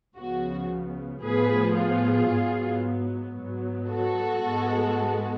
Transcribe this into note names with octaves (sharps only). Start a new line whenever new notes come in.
C#2 C#3 F3 B3 F#4
A2 F3 B3 G#4 B4
F4 G#4
G#2 F#3 B3
G#2 F#3 B3
F#4 A4
G#2 G#3 B3